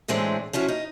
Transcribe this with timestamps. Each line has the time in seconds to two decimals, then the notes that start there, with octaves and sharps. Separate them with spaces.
0.08 A2 E3 G#3 C4 D4
0.53 F3 C#4 E4 F#4
0.68 D#4